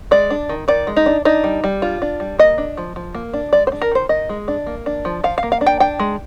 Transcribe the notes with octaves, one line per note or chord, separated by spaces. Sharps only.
G#3 D5
D4
D#3
D#3 D5
G#3
D#4
D4
D4 D#4
G3
G3
D4 F4
D4
G3
A#3 D#5
D4
F3
F3
A#3
D4
G#3 D5
C5
D4
A#4
D#3 C5
D#3 D#5
G#3
D4
A#3
D4
F3
F3 F5
F5
A#3
F5
D4
G5
D4 G5
G#3